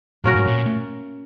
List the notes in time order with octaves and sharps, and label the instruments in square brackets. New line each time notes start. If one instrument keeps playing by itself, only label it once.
[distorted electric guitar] A#2 [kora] A#3 C#4 F#4 A#4
[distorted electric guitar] G#2
A#2